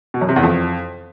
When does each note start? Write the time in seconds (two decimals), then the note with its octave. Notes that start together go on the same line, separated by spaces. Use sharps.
0.14 B2
0.21 F#2
0.29 C3
0.36 E2
0.43 F2